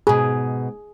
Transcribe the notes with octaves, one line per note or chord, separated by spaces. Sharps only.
G#2 B2 G#4